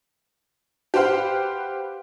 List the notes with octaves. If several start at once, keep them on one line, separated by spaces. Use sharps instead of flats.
G4 B4 C5 F5 F#5